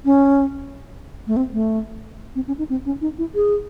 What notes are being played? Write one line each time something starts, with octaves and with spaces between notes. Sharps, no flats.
C#4
A3
C4
A3
C4
C#4
D#4
C4
C#4
D#4
E4
G#4